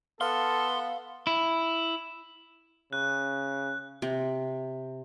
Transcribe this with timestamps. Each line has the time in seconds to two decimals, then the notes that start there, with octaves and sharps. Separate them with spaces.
0.21 B3 A4 F5 C6
1.27 E4
2.93 C#3 F#6
4.02 C3